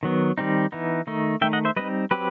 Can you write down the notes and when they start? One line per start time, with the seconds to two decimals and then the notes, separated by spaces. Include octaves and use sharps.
0.03 D#3 F#3 B3
0.38 D#3 G3 C4 D#4
0.72 E3 B3 D#4
1.07 D#3 A3 D#4
1.41 D#3 A3 D#4 E5 G5
1.53 D#5 F#5
1.65 C5 E5
1.76 G3 C4 D#4 B4 D#5
2.11 F#3 C4 G4 B4